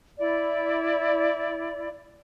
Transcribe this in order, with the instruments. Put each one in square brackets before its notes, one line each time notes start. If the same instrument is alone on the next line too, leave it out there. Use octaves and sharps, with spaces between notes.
[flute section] E4 D5